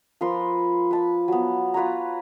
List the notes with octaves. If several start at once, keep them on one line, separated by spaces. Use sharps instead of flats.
F3 A#4 B4 C6
B4 A5 B5
F#3 B3
F4 B4 C#5 A#5